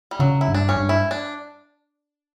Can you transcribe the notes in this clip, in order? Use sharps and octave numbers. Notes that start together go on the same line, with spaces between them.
G3
C#3 F#3
E4
G2
D4
C#4
G2
E4
D4